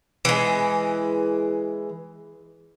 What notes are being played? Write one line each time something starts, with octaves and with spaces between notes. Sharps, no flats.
E3 G#3